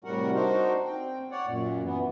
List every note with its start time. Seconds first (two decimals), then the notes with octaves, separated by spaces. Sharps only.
0.04 A2 C3 G3 F#4 A#4 F#5
0.34 D4 D#4 F#4 A#4 C5
0.85 C4 G5
1.31 C#5 D5 F#5
1.47 F#2 A#2
1.83 E3 B3